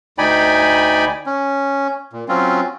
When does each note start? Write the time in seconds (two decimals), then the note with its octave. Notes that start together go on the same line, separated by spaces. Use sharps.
0.18 D2 D#4 D5 G5 G#5 B5
1.26 C#4
2.13 A#2
2.29 F#3 C4 C#4 F4